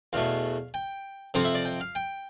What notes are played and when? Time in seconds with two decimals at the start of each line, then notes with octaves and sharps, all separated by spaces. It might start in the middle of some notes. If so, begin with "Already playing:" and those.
0.13 E2 B2 A3 F5
0.74 G5
1.34 F2 C3 F3 C4 F5
1.45 E5
1.55 D5
1.65 G5
1.80 F5
1.95 G5